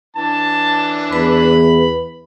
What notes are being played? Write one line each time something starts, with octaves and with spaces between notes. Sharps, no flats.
E3 D4 A5
E2 B4 B5